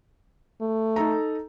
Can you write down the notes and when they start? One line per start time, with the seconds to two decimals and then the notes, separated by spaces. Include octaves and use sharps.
0.61 A3
0.96 D#4 A4 A#5